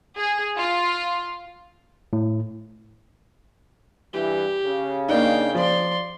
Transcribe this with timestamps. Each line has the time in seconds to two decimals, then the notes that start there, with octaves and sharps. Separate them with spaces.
0.17 G#4
0.58 F4
2.13 A2
4.13 G2 E3 G4
4.65 C#3
5.09 A#3 D4 D#4 F5 G5
5.55 F3 D5 C6